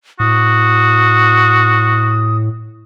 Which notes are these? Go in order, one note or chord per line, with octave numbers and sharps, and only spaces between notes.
A2 F#4 D#6